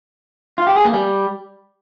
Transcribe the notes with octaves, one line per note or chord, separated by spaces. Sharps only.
F4
G4
G#4
A#3
G3